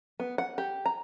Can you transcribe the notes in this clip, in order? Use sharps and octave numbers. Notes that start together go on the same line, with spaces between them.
B3
F#5
G4
A#5